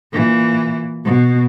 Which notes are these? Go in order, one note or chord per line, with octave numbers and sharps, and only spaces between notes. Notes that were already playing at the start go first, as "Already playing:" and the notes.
A#2 E3
B2